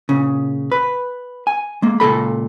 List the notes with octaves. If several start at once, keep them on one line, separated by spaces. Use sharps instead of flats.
A#2 C#3
B4
G#5
G#3 A#3
C#2 A#2 C#3 A4 B5